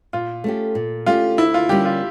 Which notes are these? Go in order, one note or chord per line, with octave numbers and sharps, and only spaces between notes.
A#2 F4
A3 C#4 G4
A#2
A3 C#4 F4 G4
D2 E4
F4
D3 G3 A#3 C#4 G4
F4